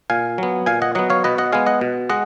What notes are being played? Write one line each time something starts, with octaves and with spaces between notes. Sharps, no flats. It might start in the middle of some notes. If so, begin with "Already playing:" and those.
A#2 F5 G#5
F#3 B3
A#2 F5 G#5
D#5 F#5
F#3 B3 D#5 F#5
C#5 F5
B2 B4 D#5
D#5 F#5
G#3 B3 F5 G#5
D#5 F#5
B2
G#3 D#5 F#5